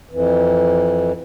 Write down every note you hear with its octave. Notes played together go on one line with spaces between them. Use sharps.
F2 E3